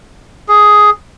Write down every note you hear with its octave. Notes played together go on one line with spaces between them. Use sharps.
G#4